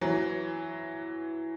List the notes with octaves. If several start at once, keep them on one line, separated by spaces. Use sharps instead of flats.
E3 F#3